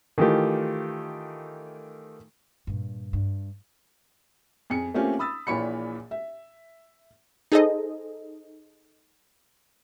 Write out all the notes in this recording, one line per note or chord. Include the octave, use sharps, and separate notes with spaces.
D#3 E3 A3 F4 G4
G2 A#2
G2
F2 G#4 G#5 C#7
A3 A#3 C4 C#4 F4 G4
B5 D#6 E6 A6
A#1 A#2 E3 C#5 B5 C#7
E5
D#4 G#4 A4 C5 D#5